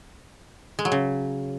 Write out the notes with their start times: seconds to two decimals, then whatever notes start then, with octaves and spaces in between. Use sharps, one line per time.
0.79 G#3
0.85 F#3
0.92 C#3